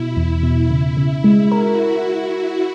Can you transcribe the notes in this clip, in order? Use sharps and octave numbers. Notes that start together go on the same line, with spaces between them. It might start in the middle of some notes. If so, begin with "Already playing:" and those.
Already playing: B2 E4
E2
B2
C#3 E4
C#3
E4
G#3
F#4 A#4